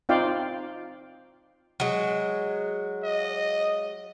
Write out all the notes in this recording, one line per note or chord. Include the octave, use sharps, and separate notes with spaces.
C4 D#4 F4 D5 F5 G5
F#3 G#3
D#5